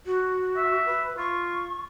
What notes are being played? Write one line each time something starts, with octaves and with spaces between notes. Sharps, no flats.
F#4
E5
B4
F4 C#6